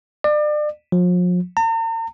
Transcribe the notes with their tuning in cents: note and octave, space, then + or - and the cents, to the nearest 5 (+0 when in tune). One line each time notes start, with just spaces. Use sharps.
D5 +35
F3 +40
A#5 -45